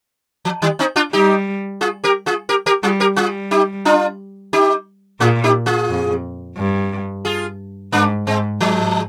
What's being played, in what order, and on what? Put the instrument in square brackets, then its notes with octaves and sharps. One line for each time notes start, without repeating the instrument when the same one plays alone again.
[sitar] F3
D#3 G3
C4 D#4
D4 F4
[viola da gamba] G3 [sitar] D#4 G4
[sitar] F4 G#4
G4 A#4
F4 G#4
G4 A#4
G4 A#4
[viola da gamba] G3 [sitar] F4 G#4
[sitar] G4 A#4
[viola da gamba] G3 [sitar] F4 G#4
[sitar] D#4 G4
D4 F4
D#4 G4
[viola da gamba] A#2 [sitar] F4 G#4
[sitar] D#4 G4
F4 G#4
[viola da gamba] F2
G2
[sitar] F4 G#4
[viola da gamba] G#2 [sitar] A#3 D4
[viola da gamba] G#2 [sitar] G#3 C4
[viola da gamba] G#2 [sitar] F3 G#3